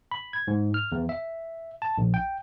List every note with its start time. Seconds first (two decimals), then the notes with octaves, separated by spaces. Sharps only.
0.11 B5
0.33 G#6
0.48 G#2
0.74 F6
0.92 E2
1.09 E5
1.82 A5
1.98 A#1
2.14 G5